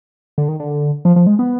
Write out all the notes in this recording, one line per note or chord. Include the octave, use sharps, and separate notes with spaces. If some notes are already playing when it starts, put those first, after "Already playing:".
D3
D#3
D3
F3
F3
G#3
B3